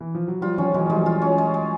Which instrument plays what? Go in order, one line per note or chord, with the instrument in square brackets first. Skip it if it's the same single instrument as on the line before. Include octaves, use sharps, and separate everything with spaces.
[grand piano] E3
F3
F#3
[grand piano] F3 G3 [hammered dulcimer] F4
[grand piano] D#3 F3 [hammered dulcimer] C#4
[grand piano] E3 F#3 [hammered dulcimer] G#3
[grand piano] F3 G3 [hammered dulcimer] G#3
[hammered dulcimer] F4
C#4
G#3
G#3